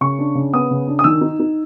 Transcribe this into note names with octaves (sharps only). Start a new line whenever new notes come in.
C#3 C#6
D4
C#3
B3 D#6
C#3
D4
D#6
D#3 E6
D#4
D#4